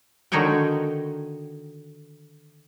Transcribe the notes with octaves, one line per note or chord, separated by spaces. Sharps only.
D3 D#3 D#4 F#4 C#5 G5